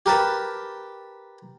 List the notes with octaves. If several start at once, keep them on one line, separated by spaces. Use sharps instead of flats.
G4 A#4 B4 A5